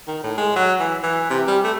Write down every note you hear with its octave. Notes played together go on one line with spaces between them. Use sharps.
D#3
A2
G#3
F#3
E3
E3
C3
G3
A3